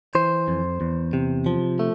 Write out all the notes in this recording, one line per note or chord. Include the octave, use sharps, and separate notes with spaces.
E3 C5
F2
E2
C3
F3
A3